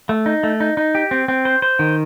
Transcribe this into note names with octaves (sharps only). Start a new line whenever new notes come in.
A3
D#4
A3
D#4
D#4
G4
C4
C4
C5
C5
D#3